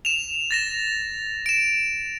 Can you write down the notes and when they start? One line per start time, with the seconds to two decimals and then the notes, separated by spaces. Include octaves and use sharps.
0.05 E7 F7
0.51 A6 A#6 E7
1.46 D7 E7